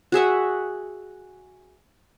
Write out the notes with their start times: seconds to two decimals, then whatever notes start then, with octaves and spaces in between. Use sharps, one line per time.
0.12 F#4 G#4 E5 F#5